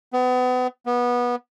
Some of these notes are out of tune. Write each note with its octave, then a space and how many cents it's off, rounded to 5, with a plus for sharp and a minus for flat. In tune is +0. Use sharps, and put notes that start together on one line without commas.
B3 +35
B3 -20